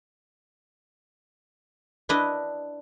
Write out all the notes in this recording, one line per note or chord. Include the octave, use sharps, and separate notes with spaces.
D4 E4 B4 D#5